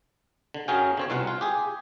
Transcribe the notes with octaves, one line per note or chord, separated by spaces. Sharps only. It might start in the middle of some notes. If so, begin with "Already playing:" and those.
D3
F#2 F#3 C#4 G#4 F5 G5
D3 C4 C#5
C2 B2 F4 F5 F#5
F4
G4 G#4